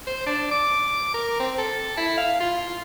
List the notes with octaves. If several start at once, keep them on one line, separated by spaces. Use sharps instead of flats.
C5
D4
D6
A#4
C4
A4
E4
F5
F4